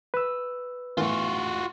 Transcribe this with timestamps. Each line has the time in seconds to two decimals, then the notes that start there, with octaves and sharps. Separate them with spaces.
0.14 B4 E6
0.97 A2 E3 F4 F#4